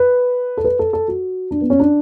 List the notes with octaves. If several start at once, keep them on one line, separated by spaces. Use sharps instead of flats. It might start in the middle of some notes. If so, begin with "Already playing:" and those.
Already playing: B4
A4
B4
A4
A4
F#4
D4
B3
C#4
D4